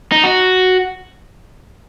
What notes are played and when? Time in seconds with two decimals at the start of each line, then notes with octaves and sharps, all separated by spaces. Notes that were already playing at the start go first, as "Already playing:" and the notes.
0.12 D#4
0.24 F#4